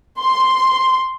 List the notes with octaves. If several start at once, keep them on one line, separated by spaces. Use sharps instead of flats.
C6